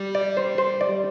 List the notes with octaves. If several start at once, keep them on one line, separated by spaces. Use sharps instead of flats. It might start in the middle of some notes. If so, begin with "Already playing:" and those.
Already playing: G3
D5
C5
C5
D5